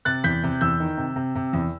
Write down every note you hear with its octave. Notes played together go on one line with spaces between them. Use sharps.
C3 F#6 A6
E2 G6 B6
C3
E2 E6 G6
D#3
C3
C3
C3
E2